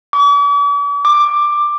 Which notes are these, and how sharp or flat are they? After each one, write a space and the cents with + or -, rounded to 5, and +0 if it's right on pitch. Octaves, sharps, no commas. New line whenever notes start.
D6 -45
D6 +10